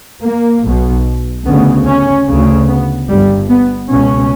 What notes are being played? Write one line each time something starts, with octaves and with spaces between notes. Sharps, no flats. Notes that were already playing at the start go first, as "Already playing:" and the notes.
A#3
B1 B2
D2 C#3 B3
C#4
D2 C#3
B3
G1 G2 G3
B3
C#2 B2 C#4